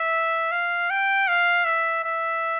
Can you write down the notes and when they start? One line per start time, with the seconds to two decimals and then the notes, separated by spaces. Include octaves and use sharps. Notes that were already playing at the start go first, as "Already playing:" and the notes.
Already playing: E5
0.52 F5
0.90 G5
1.28 F5
1.65 E5
2.04 E5